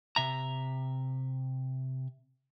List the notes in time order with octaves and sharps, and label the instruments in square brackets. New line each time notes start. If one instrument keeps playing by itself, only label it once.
[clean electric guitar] C3 E5 A#5